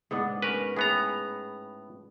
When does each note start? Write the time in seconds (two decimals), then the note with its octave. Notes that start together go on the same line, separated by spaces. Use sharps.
0.11 G#2 B3 D4
0.42 C#4 A#4 B4
0.76 A2 B3 G#4 A#5